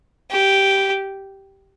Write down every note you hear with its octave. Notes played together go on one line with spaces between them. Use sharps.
G4